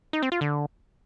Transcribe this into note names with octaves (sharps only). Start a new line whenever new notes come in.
D#4
C4
F4
D3